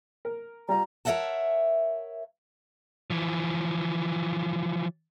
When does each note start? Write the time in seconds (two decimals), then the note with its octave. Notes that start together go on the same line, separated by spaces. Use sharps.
0.25 A#4
0.69 G3 F4 A#5
1.05 A#4 C#5 D#5 E5 F#5 A5
3.10 E3 F3